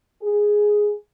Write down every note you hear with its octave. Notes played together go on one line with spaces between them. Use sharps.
G#4